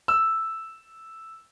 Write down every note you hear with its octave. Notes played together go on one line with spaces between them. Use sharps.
E6